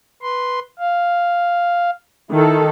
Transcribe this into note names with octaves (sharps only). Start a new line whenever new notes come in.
B4 C6
F5
D#3 E4 A4